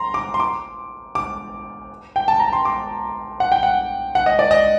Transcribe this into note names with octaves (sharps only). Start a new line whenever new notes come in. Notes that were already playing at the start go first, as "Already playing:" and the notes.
Already playing: A#5 C6
D6
C6
D6
D6
G5
A5
A#5
C6
D6
F#5
G5
F#5
F#5
D#5
D5
D#5